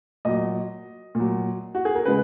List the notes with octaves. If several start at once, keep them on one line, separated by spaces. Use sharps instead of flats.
A#2 F#3 D#5
A#2 F#3
F#4
G#4
A#4
C#3 G#3 B4